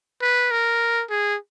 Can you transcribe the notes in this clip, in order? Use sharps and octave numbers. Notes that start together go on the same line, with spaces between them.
B4
A#4
G#4